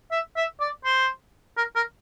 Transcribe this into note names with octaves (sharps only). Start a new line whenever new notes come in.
E5
E5
D5
C5
A#4
A#4